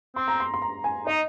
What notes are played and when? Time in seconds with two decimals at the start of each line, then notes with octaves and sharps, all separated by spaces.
0.16 C4 C6
0.28 A#5
0.40 C6
0.54 C6
0.62 A#5
0.84 G#5
1.07 D#4 D#5